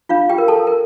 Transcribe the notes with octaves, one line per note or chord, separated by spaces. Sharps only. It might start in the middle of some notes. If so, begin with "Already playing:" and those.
D4 F4 F5
G4 G5
A#4
A4 A5
A#4